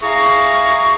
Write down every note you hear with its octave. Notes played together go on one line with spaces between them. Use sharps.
E4 G#4 F5 A#5 C#6